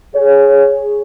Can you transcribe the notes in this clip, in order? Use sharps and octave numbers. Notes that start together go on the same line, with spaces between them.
G#4 C#5